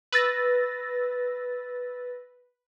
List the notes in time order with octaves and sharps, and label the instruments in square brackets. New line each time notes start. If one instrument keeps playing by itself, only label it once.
[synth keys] B4 E6 A6 A#6